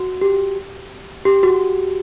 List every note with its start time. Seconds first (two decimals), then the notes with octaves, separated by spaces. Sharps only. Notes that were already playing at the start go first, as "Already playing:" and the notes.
Already playing: F#4
0.21 G4
1.25 G4
1.43 F#4